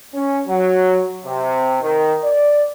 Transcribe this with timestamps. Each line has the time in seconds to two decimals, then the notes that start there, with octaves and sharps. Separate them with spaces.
0.13 C#4
0.48 F#3
1.25 C3
1.82 D#3
2.24 D5